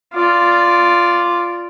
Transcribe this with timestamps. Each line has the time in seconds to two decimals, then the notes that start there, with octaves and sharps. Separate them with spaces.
0.14 F4 D5